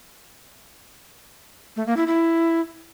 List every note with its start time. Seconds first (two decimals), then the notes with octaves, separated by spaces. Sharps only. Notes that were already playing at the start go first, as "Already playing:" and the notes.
1.76 A3
1.87 A#3
1.97 E4
2.07 E4